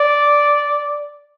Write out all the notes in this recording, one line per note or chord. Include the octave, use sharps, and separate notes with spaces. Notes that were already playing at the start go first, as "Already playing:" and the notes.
Already playing: D5